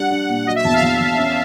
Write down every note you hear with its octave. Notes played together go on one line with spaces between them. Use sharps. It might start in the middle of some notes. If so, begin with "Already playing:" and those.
Already playing: G3 D4 F#5
D4
A#2
F#3 D#5
E5
E2 A5
F5
E2
E2
C#4